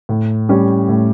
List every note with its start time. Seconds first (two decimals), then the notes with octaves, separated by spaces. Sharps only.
0.09 A2
0.49 G3 C#4 G4
0.89 A2